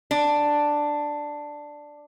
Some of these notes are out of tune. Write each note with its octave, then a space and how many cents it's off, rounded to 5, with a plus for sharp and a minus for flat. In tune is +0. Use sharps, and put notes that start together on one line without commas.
D4 +5